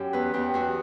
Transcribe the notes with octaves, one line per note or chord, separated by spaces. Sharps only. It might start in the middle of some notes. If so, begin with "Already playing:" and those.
Already playing: F#2 G4
E2 B4
E2 G4
E2 F#4